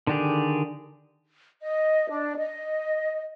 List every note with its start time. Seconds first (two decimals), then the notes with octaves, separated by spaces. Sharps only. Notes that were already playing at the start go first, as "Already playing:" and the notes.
0.07 D3 D#3 D4 G4 G#4
1.62 D#5
2.10 D4
2.37 D#5